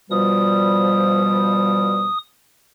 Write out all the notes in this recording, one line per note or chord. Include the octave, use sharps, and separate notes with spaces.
B2 F3 G3 D#6